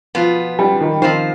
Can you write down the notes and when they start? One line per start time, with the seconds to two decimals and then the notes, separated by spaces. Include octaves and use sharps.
0.15 B2 F3 B3 F4
0.59 G3
0.81 D#3
1.02 D#3 F3 C4 F4 C5